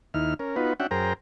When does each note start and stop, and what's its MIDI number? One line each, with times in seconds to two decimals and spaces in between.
0.14 0.34 39
0.14 0.34 63
0.14 0.34 64
0.14 0.34 89
0.39 0.56 61
0.39 0.56 70
0.56 0.73 59
0.56 0.73 63
0.56 0.73 65
0.56 0.73 66
0.56 0.73 71
0.80 0.87 61
0.80 0.87 62
0.80 0.87 66
0.80 0.87 76
0.80 0.87 78
0.80 0.87 79
0.91 1.13 42
0.91 1.13 68
0.91 1.13 70
0.91 1.13 72
0.91 1.13 79
0.91 1.13 82